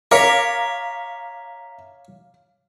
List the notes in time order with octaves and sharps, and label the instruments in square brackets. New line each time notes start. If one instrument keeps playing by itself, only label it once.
[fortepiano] A#4 [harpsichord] C#5 [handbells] E5 A#5 B6 [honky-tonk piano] F5 D6